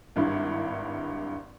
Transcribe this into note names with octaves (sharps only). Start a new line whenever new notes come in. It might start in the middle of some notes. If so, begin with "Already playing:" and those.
G#1 G2 E4